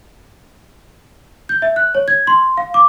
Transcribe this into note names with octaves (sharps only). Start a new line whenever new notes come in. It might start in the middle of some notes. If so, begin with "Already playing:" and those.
G6
E5
F#6
C#5
G#6
C6
F5
D6